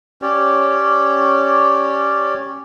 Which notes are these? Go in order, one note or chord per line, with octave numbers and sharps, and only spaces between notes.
C#4 G4 C#5 D5